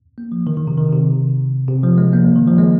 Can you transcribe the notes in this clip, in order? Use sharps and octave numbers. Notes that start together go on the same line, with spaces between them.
A#3
F3
D#3
D#3
C3
D#3
C3
C3
F3
G#3
A#3
D#3
F3
G#3